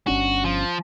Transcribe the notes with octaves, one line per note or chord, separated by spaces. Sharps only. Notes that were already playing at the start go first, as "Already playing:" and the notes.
G1 C#4 D4 F#4
F3